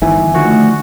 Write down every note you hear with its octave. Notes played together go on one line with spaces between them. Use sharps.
G1 D#3 E3 E5 G#5
D2 D3 D#3 F3 A3 F#4